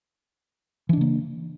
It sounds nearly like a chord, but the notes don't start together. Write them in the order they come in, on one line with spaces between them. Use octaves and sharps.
E3 D4 C#3 A#3